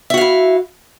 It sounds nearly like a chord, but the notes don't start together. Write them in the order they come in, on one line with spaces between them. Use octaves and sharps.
E5 F#4 F5 E4